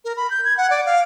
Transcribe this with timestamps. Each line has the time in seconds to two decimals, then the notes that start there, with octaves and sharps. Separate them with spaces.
0.05 A#4
0.17 B5
0.30 G6
0.45 G#6
0.57 F#5
0.70 D5
0.86 F5